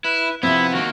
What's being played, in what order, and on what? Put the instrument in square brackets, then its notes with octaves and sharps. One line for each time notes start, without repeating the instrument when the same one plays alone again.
[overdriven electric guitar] E4 [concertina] B4
[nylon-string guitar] C3 F3 C4 [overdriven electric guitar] B3 [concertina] E4 E5
[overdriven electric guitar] D#3 A#3 [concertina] F#4